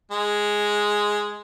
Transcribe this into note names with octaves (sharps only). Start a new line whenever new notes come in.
G#3